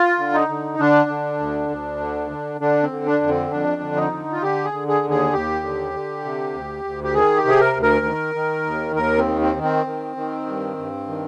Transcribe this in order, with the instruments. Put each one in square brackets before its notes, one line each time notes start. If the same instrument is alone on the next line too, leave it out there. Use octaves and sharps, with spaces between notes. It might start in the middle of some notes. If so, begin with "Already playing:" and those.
Already playing: [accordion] F4
D3
D#4
D3
D3 D4
D3
D2
D2
D3
D3
D3 D4
C4
D3
D4
F2
C4
F2 D4
D3
D#4
D3
F4
D3 G4
G#4
D3
G#4
D#2
G#4
D#2 G4
D3
D3
C3
D2
D2
G4
D#3 G#4
G4
C3 G#4
A#4
D2
A#4
D#3
D#3
D#2
D#2 A#4
C4
D#3
C4
D#3
C4
D#3
D#3
G2
G2
D#3